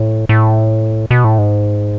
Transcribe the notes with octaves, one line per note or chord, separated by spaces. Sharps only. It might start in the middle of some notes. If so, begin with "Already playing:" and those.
Already playing: A2
A2
B2
A2
G#2